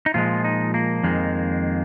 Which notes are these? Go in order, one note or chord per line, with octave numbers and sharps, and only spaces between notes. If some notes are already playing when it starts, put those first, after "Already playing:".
D#4
A#2 F3 G#3 F4
D#4
A#3
F2 D#3 G#3